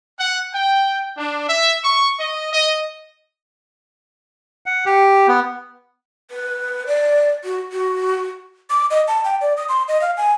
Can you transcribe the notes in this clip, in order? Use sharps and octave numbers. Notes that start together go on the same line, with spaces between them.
F#5
G5
D4
E5
C#6
D#5
D#5
F#5
G4
B3
B4
D5
F#4
F#4
D6
D#5
A5
G5
D5
D#6
C6
D#5
F5
G#5